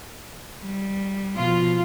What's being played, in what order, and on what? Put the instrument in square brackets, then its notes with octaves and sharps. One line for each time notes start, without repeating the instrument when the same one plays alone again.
[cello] G3
[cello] B2 F3 [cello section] F4